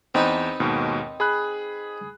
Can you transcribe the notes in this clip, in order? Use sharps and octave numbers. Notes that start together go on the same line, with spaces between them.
E2 C4 D#4 B4
D#2 G#2 B2
G#4 B5 F#6